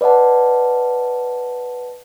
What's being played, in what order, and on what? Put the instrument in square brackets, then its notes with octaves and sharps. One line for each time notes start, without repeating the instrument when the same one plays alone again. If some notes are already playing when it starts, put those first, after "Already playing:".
[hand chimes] B4 D5 D#5 F#5 A5